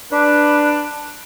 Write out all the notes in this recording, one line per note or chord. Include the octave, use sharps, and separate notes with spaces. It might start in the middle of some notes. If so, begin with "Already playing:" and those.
D4 B4